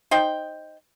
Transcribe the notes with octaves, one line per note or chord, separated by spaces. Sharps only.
D#4 C5 G5